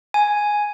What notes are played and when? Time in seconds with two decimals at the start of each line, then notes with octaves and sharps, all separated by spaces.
0.14 G#5